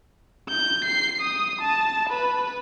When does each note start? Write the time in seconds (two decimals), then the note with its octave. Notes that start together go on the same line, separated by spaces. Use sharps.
0.49 G6
0.84 C7
1.21 D#6
1.61 A5
2.09 B4